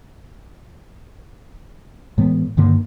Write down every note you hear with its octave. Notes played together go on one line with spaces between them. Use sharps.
A2 E3 G#3 B3
G2 D3 D#3 A#3